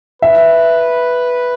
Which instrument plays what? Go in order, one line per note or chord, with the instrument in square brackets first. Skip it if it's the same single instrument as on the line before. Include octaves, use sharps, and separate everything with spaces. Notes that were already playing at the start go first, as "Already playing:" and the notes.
[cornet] B4 [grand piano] E5